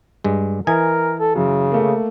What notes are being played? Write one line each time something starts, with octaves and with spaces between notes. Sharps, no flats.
G2 G#3
E3 A#4 D#5 G#5
A4
F#2 C#3
A3 A#3